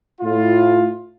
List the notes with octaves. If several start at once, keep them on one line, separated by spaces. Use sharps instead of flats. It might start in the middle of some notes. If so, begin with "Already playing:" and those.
A2 F4